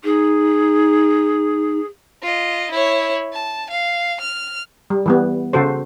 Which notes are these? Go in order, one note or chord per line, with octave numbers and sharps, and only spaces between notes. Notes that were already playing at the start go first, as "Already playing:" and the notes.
D#4 G#4
F4 D#5
E4 C#5
A5
F5
F6
G3
E3 G3 B3
C#3 F#4 A4 C5